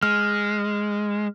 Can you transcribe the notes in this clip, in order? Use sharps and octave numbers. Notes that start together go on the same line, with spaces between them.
G#3 F6